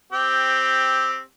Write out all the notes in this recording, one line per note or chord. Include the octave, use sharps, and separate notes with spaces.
C4 G4